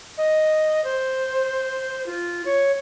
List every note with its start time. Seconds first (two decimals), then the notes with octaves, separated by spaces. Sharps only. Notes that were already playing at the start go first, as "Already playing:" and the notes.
0.18 D#5
0.84 C5
2.06 F4
2.45 C#5